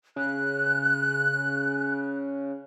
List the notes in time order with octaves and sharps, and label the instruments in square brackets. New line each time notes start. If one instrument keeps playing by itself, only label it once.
[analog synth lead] C#3 [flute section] F#6